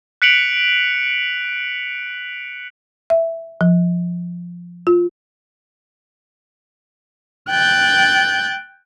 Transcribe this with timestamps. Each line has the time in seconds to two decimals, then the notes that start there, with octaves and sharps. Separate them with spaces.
0.22 F#6 B6 C#7 D7 F7 F#7
3.10 E5
3.61 F3
4.87 F4
7.50 G5 F#6 G6 A6